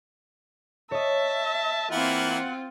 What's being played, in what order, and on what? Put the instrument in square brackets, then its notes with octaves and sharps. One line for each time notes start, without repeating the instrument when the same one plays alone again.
[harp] C#5 D#5 [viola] E5 [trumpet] A5
[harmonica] E3 A#3 E4 [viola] C4 F4 [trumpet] F#5